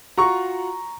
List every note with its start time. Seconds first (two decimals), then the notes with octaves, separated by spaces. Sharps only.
0.18 F4 F#4 A#5 C#6